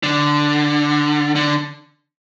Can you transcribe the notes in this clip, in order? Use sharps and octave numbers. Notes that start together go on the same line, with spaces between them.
D3
D3